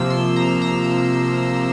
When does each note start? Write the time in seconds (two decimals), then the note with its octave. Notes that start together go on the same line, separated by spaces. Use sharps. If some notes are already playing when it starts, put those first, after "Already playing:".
Already playing: C3 F3 A#3 E6
0.10 C6
0.36 A#5
0.62 A#5